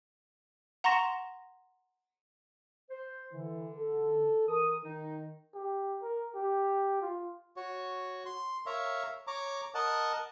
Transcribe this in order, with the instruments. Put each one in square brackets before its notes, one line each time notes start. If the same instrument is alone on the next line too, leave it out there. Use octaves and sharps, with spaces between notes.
[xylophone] F#5 A#5 C6 C#6 A#6 E7
[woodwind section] C5
[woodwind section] D3 [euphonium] E3
[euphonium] A4
[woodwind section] E3 D#6 [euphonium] A#4
[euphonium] D#3 [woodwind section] D#4
[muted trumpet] G4
A#4
G4
F4
[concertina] F#4 C#5
C6
A#4 C#5 E5 F5 A#5
C#5 A#5 D6
A#4 D#5 F#5 A5